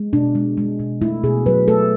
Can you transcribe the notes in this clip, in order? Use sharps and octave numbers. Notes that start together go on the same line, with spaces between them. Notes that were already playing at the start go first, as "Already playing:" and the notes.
Already playing: G#3
B2 D4
G#3
G#3
B2
A3 E4
B2 G#4
F#3 B4
A3 A4